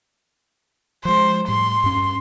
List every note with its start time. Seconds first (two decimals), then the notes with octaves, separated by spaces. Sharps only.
1.05 F3 G#3 C5
1.48 A2 G3 C6
1.84 G2 C#4